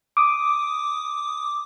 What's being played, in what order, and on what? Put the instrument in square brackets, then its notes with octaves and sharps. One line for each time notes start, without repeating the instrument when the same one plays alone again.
[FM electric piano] D6 D#6